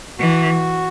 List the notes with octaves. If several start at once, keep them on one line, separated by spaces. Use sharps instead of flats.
E3 F#4